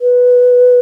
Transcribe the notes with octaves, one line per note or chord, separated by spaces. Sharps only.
B4